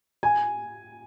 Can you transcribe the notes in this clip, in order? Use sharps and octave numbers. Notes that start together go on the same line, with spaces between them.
G#5